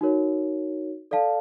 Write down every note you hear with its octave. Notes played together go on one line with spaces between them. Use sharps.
D#4 F#4 A#4 C#5
A4 D5 F5 A5